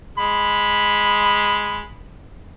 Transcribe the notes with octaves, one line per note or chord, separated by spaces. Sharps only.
G#3 B5